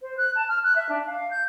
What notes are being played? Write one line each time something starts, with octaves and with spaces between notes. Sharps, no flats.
C5
F#6
A5
F6
F#6
E5
D4
F5
G6